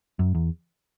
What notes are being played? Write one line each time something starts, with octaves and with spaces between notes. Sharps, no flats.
F#2
E2